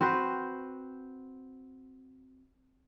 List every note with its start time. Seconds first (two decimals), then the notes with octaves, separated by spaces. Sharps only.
0.01 C4 F#4 B4 C5